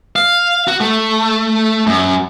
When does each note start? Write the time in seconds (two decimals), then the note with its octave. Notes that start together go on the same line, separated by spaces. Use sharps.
0.16 F5
0.68 F#4
0.80 A3
1.87 F#2